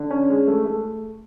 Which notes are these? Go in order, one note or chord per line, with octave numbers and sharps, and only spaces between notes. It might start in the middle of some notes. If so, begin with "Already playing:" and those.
Already playing: D3
C#4
G#3
A3
A3